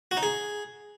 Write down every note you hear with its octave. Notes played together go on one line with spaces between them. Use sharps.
F#4
D#4
G#4